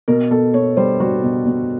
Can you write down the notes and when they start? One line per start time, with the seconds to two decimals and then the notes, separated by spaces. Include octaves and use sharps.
0.08 B2 A#4
0.31 B2 A4
0.54 B2 C#5
0.77 G3 C5
1.00 G3 F#4
1.23 B2
1.46 B2